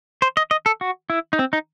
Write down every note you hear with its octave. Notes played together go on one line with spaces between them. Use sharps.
C5
D#5
D#5
A4
F#4
E4
D#4
C4
D#4